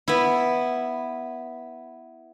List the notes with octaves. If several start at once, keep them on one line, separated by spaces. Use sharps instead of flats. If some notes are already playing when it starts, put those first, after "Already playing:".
B3 E4